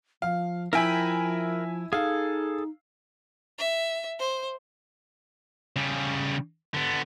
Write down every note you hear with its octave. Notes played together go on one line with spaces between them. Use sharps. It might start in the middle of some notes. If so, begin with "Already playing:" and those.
F3 F5
F3 E4 A#4 E5 G5 G#5 B5
D#4 G#4 A4 F5
E5
C5
C#3 G3
D3 B3